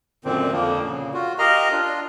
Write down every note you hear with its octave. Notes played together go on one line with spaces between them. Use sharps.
F#2 A#2 D3 D#3 C4
F2 D3 F3 A#3
A#2 C#3
F4 F#4
G4 A#4 D#5 F5 A#5 F6
D4 F4